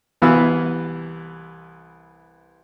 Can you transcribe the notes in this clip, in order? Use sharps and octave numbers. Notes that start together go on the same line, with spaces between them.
C2 E3 B3 F5 G#5 E6